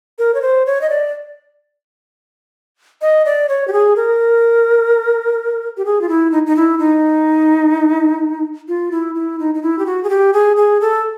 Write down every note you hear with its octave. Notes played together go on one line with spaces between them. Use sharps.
A#4
C#5
C5
C#5
D#5
D5
D#5
D5
C#5
G4
G#4
A#4
G4
G#4
F4
E4
D#4
D#4
E4
D#4
F4
E4
E4
D#4
D#4
E4
G4
F#4
G#4
G4
G#4
G#4
A4